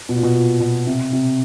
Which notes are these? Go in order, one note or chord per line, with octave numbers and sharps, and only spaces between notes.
B2
A#2
B2
A#2
B2
C3
C3